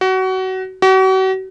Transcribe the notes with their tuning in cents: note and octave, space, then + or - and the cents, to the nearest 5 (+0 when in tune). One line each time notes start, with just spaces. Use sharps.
F#4 +25
F#4 +40